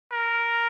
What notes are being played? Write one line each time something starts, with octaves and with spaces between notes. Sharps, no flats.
A#4